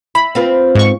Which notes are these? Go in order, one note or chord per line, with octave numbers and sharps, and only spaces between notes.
E4 B5
C4 F4 B4
G#2 C#6